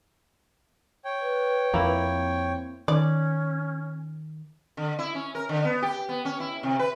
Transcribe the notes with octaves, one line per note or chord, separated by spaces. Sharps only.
C#5 G5
B4
F2 A#3 E4
C4
D#3 C#4 D5
D3
E4
C#4
A#4
D3
B3
G4
B3
C#4
E4
C3
B4